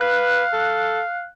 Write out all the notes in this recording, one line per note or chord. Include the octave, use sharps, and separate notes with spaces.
B4 F5 F#6
A4